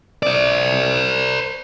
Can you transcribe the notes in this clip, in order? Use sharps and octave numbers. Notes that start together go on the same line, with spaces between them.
C5 D5